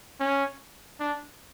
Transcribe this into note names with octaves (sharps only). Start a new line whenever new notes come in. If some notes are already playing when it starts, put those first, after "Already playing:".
C#4
D4